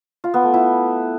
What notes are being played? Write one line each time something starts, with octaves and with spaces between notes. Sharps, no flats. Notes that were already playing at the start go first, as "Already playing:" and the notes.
F4
B3
A3
E4